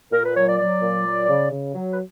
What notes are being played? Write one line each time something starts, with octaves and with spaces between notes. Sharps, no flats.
A#2 A#4
B4
F#3 C#5
D5
F#3 D5
A#2
F#3
C#3
C#3
F#3
B4